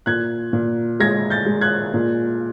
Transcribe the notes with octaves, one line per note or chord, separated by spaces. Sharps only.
A#2 F#6 G#6
A#2
G#3 G#6 A#6
G6 A6
G#3
F#6 G#6
A#2